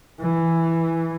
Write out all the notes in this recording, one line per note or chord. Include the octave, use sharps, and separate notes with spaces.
E3